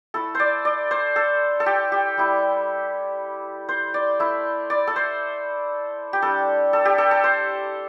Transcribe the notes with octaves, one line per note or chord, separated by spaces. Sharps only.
A3 E4 A4
C5 D5
D5
C5
A4
A4
G4
G4
G3 E4
C5
D5
A3 E4
D5
A4
C5
G4
G3 D4 A4
A4
G4
A4
A4
C5